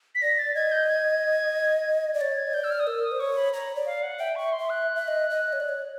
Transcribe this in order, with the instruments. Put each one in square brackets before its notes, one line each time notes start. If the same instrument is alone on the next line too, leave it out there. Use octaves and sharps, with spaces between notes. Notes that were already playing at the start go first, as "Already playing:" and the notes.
[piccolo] B6
[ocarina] D5 [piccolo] A#6
[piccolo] A6
[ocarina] D#5 [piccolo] G#6
[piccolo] G6
G#6
[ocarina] D5
[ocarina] C#5 [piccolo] A6
[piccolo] G#6
[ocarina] D#5
[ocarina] D5 [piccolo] G6
[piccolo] E6
F6
D#6
[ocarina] A#4 [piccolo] E6
[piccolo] D#6
[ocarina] C5
[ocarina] C#5 [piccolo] C#6
[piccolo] B5
[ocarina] C#5 [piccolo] A#5
[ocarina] D5
[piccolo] F5
F#5
[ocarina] E5 [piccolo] G5
[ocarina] E5 [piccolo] C#6
[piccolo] C6
[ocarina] E5
[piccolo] F#6
[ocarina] E5
D#5
D#5
C#5
D5
C#5